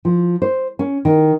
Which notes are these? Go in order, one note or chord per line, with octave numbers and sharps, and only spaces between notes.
F3
C5
C#4
D#3